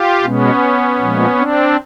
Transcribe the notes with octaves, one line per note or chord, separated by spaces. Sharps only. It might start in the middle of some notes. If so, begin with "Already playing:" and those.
Already playing: F4 G4
B2 G#3 B3 C#4
A#2 F3 G#3
C4 D4